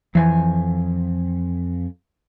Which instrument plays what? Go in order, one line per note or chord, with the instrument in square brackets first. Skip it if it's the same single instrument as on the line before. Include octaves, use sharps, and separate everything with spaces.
[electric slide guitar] F2 G#5 [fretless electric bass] E3